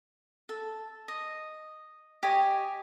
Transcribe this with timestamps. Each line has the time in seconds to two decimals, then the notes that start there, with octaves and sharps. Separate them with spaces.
0.49 A4
1.08 D#5
2.23 G4 C#5 D#5 G#5